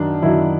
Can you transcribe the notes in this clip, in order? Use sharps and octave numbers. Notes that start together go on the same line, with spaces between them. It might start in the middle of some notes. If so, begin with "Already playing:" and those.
Already playing: F#2 D#3 F#3 D4
F#2 D#3 F#3 E4